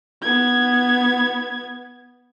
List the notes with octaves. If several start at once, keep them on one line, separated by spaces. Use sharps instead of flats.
B3 G#6